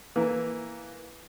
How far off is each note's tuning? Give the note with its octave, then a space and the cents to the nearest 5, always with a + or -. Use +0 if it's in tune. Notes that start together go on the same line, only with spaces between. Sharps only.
E3 +0 A#3 +0